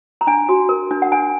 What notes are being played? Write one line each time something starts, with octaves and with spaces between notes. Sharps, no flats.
A#5
D4 G#5
F#4
A#4
D4
F#5
D4 G#5